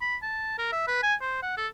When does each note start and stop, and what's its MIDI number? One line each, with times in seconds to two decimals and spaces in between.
0.01 0.16 83
0.23 0.57 81
0.58 0.67 70
0.72 0.86 76
0.87 1.01 71
1.03 1.14 80
1.21 1.41 72
1.42 1.56 78
1.57 1.67 69